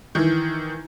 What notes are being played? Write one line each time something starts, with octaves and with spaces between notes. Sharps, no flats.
D#3 E3